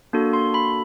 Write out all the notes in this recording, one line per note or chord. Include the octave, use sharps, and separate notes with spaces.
A#3 D4 F#4 A4
C6
B5